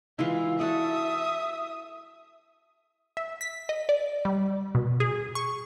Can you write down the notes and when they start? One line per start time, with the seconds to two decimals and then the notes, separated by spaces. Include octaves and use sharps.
0.19 E3 G#3 E4 F4
0.59 F#4 A4 D5 E5 D#6
3.17 E5
3.41 B6
3.69 D#5
3.89 D5
4.25 G3
4.75 B2
5.00 G#4
5.35 C#6